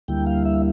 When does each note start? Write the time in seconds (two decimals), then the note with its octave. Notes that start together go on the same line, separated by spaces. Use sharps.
0.08 D2 D3 G3 A#3 E4 G5
0.27 F5
0.45 E5